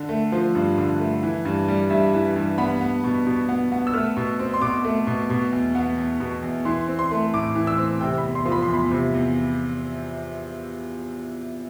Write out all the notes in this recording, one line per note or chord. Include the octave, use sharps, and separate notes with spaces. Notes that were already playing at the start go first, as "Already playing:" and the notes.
Already playing: D3
A3
F3
G2
D3
A3
E3
G2
G3
G2 E5
E3
G2
B3 B5
B3
B2
B2
B3
B3
E6
A3 F6
B2
C4
C6
B2 D6
A3
B2
B2
E2
B3
E2
B2
E2
E3 C6
C4
C6
A3
A2 D6
E3
E6
C4
C3 G5
B5
E2
C6
F3
B5
C6
E2
B5
C3
E2